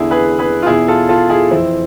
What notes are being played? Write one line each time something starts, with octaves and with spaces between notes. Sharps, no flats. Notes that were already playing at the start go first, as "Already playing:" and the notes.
Already playing: E2 D3 E4 G#4
G#4 B4
G#4 B4
F4
E2 B2 E4 G#4
F4 A4
F4 A4
E4 G#4
F2 E3 C4 E4